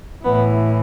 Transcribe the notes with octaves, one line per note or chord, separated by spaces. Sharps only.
A2 E3 B3